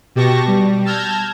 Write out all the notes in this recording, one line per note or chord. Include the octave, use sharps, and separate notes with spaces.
B2 G4 A5 C#6 A#6
G3
A5 E6 F6 G6 G#6 A#6